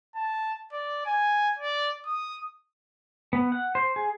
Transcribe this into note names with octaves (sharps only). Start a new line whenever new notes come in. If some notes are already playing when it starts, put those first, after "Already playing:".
A5
D5
G#5
D5
D#6
B3
F#5
C5
G#4